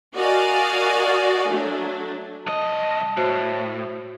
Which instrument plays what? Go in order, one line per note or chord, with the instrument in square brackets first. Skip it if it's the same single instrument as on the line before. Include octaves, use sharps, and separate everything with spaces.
[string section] F#4 A#4 D5 D#5 F5 G#5
F#3 A3 D4
[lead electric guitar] C2 D#5 [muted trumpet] A5
[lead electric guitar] A2 [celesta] F#4 C5 C7